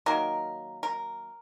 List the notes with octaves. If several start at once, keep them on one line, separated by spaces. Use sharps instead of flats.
D#3 F#3 A#3 A#4
A#4